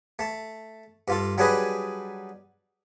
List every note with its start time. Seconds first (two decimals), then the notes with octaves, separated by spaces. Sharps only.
0.19 A3 A5
1.08 G2 F4 A4
1.38 F#3 G3 D4 G#4 B4 D#5